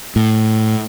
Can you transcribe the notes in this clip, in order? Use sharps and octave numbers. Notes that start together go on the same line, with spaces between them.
A2